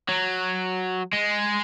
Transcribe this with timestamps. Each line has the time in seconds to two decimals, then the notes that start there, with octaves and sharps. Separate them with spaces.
0.09 F#3
1.13 G#3